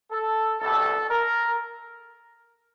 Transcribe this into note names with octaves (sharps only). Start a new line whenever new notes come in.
A4
C2 B2 G3 A4
A#4